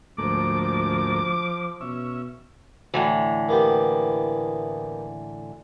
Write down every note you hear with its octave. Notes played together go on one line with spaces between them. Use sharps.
D2 G#2 F3 A3 A#3 D6
B2 C#4 E5
A2 D3 E3
A#3 B3 G4